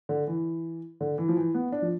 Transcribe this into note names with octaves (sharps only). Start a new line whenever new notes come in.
D3
E3
D3
E3
F3
E3
B3
D4
F3